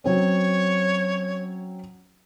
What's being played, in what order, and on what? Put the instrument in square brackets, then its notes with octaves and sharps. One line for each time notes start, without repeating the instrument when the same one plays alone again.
[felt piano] F#3 C4 C#4 [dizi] C#5